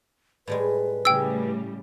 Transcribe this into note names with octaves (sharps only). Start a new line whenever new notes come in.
A2 G3 G#3 B4
A2 C#3 G3 G#4 G5 E6